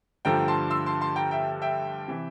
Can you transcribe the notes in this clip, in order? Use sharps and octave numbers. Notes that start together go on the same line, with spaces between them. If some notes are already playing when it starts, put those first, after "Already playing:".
G2 D3 F3 A3 G5 A#5
A5 C6
C6 E6
A5 C6
A5 C6
G5 A#5
E5 G5
E5 G5
C3 E3